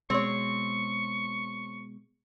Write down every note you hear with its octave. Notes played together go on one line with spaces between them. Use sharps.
B2 G#3 C4 C#5 C#6